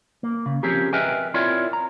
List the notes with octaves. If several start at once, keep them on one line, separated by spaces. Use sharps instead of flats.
A#3
C#3
F3 C4 C#4 G4 G#4 A#4
A#4 B4 D#5 E5 G5 G#5
C4 E4 F4 A#4 C#5 D5
A#5